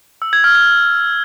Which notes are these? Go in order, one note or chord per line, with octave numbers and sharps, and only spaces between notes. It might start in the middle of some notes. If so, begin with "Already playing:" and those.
E6
G#6
F6
G#6